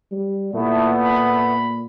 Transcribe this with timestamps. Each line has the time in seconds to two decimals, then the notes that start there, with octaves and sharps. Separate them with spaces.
0.12 G3
0.54 A#2 A3 B3 E4
1.03 B5